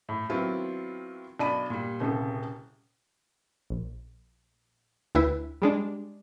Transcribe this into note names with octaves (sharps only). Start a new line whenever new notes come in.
A2
D#3 F#3 B3 C4 E4 F4
B1 D4 D5 A5 B5 D#7
A#2 G3
D#1 C2 C#3 A4
A#1
D2 E4 B4
G3 G#3 D4